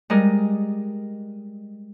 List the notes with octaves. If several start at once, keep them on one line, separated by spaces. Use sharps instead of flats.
G3 G#3 A#4 D#5